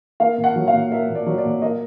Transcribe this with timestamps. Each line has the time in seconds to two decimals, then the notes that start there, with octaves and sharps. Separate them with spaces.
0.20 A#3 F5
0.38 A#2
0.44 F#5
0.56 F#3
0.68 F5
0.73 A#2
0.92 A#3 E5
1.09 A#2
1.15 D5
1.26 F#3
1.38 D5
1.45 A#2
1.62 A#3 D#5